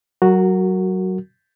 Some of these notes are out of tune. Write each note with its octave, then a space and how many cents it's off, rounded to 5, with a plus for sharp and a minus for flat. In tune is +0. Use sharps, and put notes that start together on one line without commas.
F#3 +25 F#4 +0 A#4 -20